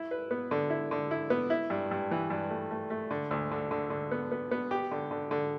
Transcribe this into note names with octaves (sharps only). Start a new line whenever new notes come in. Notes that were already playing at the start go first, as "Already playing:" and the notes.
Already playing: E4
B4
B3
D3
E4
D3
E4
B3
E4
G2
G2
E3
G2
A3
A3
A3
D3
D2
D3
D3
D3
B3
B3
B3
G4
D3
D3
D3